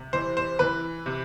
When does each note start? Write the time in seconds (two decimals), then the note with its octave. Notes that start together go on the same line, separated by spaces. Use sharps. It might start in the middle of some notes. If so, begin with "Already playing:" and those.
Already playing: C3
0.13 E3 C5
0.37 C5
0.59 E3 B4
1.06 C3